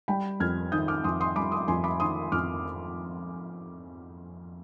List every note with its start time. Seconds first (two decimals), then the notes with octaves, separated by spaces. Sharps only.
0.08 G3 G5 B5
0.40 F2 F6 G#6
0.72 D#3 D#6 G6
0.88 D6 F6
1.04 F2 C6 D#6
1.20 C6 D#6
1.36 G3 B5 D6
1.52 C6 D#6
1.68 F2 G#5 C6
1.84 B5 D6
2.00 D#3 C6 D#6
2.32 F2 D6 F6